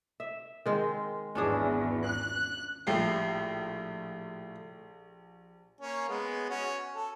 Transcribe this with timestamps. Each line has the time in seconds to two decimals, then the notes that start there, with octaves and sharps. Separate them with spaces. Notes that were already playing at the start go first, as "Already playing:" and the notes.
0.20 E5
0.66 D#3 G#3 C4
1.35 G#1 E2 C#4 D4 G#4
2.06 F#6
2.87 A#1 A2 G4 C7
5.81 A#3 C#4
6.08 G#3 B3
6.49 C#4 F#4
6.95 A4